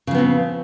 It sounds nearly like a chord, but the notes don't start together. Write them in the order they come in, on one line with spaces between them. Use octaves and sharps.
C#3 F3 B3 C4